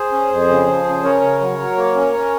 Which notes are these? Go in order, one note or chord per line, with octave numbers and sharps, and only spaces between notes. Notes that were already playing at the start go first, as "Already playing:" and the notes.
Already playing: G#4 C5
C#4
F2
C#3
F3
C#3
C#4 A#4 C#5
C#3
F#3
F#3
A#3
C#4
C#4